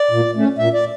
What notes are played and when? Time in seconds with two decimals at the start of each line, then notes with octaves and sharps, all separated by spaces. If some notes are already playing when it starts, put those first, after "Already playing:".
Already playing: D5
0.11 A#2
0.35 A3 C#4
0.58 A#2 E5
0.74 D5